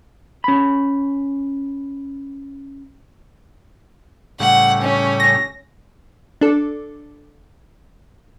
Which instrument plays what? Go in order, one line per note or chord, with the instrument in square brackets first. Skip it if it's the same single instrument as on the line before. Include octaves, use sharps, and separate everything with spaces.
[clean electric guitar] C#4 B5
[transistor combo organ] A2 C#3 G3 [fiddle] F#5
[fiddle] C#4
[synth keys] A#6
[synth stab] D4 A4